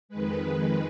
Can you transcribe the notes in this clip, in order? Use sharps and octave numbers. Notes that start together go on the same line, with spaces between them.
F2 D#3 G#3 B4